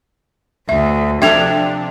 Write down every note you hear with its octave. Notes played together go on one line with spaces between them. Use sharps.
D2 E5
C3 F3 D4 A4 E5 G5 G#6 F7